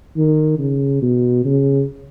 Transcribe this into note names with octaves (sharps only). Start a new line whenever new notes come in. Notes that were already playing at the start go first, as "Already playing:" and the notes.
D#3
C#3
B2
C#3